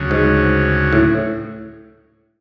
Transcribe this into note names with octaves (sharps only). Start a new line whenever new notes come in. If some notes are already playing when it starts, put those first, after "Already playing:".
Already playing: D2 C#3 F#3
G#2
A2